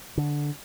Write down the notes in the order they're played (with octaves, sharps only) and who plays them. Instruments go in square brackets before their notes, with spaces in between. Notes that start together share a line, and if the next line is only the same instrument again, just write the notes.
[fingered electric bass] D3